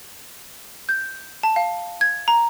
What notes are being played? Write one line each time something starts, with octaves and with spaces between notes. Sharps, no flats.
G6
A5
F5
G#6
A#5